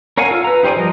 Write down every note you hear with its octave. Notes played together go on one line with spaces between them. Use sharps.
A#4 C#5 F5 F#5 G#5
F4 A4
B4 A#5
D#4 G4 C5 D5 G#5
F3 G3 A#4 D#5